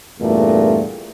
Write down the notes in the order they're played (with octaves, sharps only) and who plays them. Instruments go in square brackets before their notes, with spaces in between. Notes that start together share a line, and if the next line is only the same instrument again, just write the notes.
[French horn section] E2 G2 A#2 A3